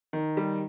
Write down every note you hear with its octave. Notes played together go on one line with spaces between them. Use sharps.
D#3
G3